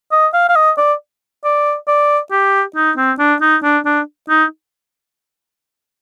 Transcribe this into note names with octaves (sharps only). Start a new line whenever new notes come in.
D#5
F5
F5
D#5
D5
D5
D5
G4
D#4
C4
D4
D#4
D4
D4
D#4